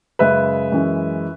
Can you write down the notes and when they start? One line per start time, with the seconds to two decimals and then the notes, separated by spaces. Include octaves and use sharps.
0.19 F#2 C#3 G#3 B4 E5
0.72 F#2 E3 G#3